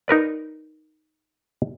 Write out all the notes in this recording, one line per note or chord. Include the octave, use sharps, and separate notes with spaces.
D#4 A#4 B4 D5